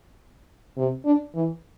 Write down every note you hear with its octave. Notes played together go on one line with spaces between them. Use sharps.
C3
D4
E3